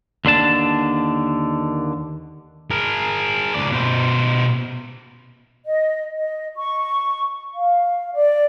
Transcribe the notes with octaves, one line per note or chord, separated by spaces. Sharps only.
D#2 D3 D4 A5
G#4 A#4
C#2 D5
B2 C5
D#5
D#5
C#6
F5
D5